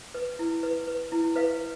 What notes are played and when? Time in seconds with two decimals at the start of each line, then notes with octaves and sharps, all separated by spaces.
0.14 B4
0.39 E4
0.63 B4
0.87 B4
1.12 E4
1.36 B4 F5